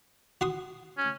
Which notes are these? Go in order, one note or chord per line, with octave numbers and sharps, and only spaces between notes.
F#4 C6 D#6
C#4